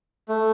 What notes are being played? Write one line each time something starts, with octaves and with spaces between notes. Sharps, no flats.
A3